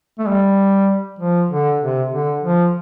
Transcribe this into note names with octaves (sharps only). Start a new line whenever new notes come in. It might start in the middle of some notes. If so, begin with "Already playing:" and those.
A3
G3
F3
D3
C3
D3
F3